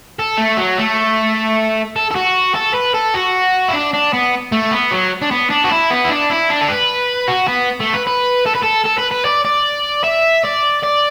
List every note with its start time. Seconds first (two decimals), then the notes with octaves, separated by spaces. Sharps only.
0.19 A4
0.38 A3
0.58 F#3
0.78 A3
1.96 A4
2.11 A4
2.15 F#4
2.55 A4
2.75 B4
2.94 A4
3.14 F#4
3.69 E4
3.74 D4
3.94 D4
4.13 B3
4.52 A3
4.71 B3
4.91 F#3
5.22 D4
5.31 B3
5.50 D4
5.64 F#4
5.71 E4
5.90 B3
6.05 E4
6.10 D4
6.30 E4
6.50 D4
6.61 A4
6.69 B4
7.28 F#4
7.48 B3
7.81 A3
7.94 B4
8.07 B4
8.46 A4
8.55 B4
8.63 A4
8.85 A4
8.99 B4
9.12 B4
9.25 D5
9.45 D5
10.04 E5
10.44 D5
10.83 D5